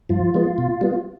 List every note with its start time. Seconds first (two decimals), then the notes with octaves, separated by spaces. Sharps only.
0.09 G2 F3 F4
0.34 F3 G#3 B3
0.58 B2
0.81 G3 B3